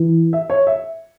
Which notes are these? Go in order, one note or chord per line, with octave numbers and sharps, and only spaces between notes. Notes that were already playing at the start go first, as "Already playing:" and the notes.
Already playing: E3
E5
C#5
E5